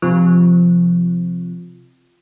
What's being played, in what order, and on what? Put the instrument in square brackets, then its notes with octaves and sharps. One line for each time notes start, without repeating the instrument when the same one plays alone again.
[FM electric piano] C3 F3